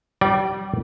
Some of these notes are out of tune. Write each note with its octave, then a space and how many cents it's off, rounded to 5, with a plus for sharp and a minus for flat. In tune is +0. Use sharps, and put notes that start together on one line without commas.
G3 -25 D5 +0